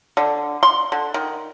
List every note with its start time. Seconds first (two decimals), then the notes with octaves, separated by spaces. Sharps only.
0.17 D3
0.63 C6
0.92 D3
1.14 D#3